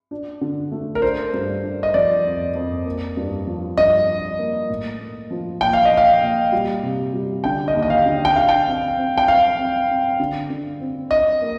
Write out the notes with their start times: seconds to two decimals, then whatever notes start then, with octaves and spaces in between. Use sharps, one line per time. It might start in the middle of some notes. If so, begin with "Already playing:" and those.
0.11 D4
0.41 D3
0.72 A3
0.95 A#4
1.02 D4 C5
1.34 G2
1.63 D4
1.83 D#5
1.94 F3 D5
2.25 F2
2.55 F2
2.85 A#3
3.17 G2
3.47 F3
3.77 G2 D#5
4.08 D4
4.38 A#3
4.69 A2
4.99 A#3
5.31 F3
5.60 A#2 G5
5.73 F5
5.85 D#5
5.91 A#2
5.97 F5
6.21 A#2
6.52 G3
6.83 C3
7.13 G3
7.44 D3 G5
7.68 D#5
7.74 D#2
7.82 D#5
7.90 F5
8.06 D3
8.25 G5
8.35 D3 F5
8.49 G5
8.66 C4
8.98 C4
9.18 G5
9.28 C4 F5
9.58 C4
9.89 C4
10.20 D3
10.50 D3
10.80 C4
11.11 D4 D#5
11.41 A#3